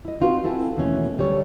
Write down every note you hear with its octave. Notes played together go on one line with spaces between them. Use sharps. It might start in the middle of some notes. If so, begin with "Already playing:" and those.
E4 D#5
C4 D#4 F4 F#4 B4
C4 E4 A4 F#5 G#5
D#2 B2 E3 A3 C#4
D2 G3 A3 C#5